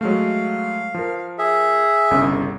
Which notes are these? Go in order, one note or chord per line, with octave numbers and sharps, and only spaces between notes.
F#3 G#3 A3 F5
F3 A#4
G#4 E5
G1 C2 C#3